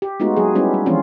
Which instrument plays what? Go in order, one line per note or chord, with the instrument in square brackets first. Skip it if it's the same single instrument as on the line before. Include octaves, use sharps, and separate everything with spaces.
[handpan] G4
G#3 A3 B3 D#4 F4 F#4
F#3 A#3 G#4
G3 B3 C#4 D#4 E4 G4
G3
E3 F3 G#3 C4 C#4 F4